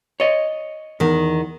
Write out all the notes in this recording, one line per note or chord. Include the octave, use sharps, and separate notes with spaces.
C#5 D#5
E2 D#3